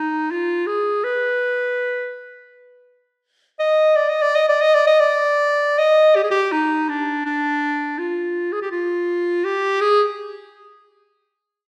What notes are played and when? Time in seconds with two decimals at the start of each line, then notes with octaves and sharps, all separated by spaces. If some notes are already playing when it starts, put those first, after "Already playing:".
Already playing: D#4
0.31 F4
0.67 G#4
1.04 B4
3.59 D#5
3.96 D5
4.09 D#5
4.22 D5
4.35 D#5
4.49 D5
4.61 D#5
4.74 D5
4.87 D#5
5.00 D5
5.78 D#5
6.16 G4
6.23 G#4
6.31 G4
6.52 D#4
6.89 D4
7.25 D4
7.98 F4
8.52 G#4
8.62 G4
8.71 F4
9.45 G4
9.81 G#4